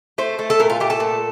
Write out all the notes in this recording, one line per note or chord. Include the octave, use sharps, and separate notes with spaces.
A3 C5
A3
A4
A#2 A#4
F4
A3 G4
A4
A#2